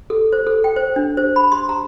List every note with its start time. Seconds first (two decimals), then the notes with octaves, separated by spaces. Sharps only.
0.10 A4
0.33 C5
0.47 A4
0.64 G5
0.76 C5
0.96 D4
1.17 C5
1.36 B5
1.52 C6
1.69 A#5